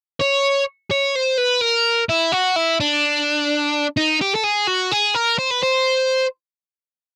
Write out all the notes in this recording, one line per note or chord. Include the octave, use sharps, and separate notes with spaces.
C#5
C#5
C5
B4
A#4
E4
F#4
E4
D4
D#4
G4
A4
G#4
F#4
G#4
A#4
C5
B4
C5